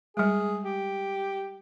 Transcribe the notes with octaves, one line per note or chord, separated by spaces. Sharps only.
G3 G#3 G#4
G4